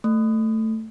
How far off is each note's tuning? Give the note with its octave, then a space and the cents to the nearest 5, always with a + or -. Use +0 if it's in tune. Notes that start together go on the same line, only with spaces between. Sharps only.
A3 +10